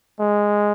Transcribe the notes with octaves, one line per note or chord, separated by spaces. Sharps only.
G#3